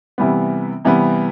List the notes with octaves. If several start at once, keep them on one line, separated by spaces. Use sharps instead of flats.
C3 E3 G3 B3
C3 E3 G3 B3